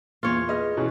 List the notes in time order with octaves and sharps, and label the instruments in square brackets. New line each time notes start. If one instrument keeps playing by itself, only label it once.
[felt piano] E2 A#2 [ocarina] A#3 [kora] F4 C#5
[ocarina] G#4 [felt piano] B4 D#5 F6
[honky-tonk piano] B2 E3 C#4